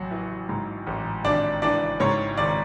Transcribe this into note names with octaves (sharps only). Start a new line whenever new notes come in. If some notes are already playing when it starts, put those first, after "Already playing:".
Already playing: A1 F#3 F#4
E3
G#2
A1
G#1 D4 D5
E3 D4 D5
G#2 C#4 C#5
G#1 D5